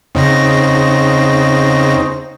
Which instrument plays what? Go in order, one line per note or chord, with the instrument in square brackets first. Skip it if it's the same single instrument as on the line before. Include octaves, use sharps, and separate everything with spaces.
[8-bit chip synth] E2 C#3 A#6 [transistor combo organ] C4 C#4 D#4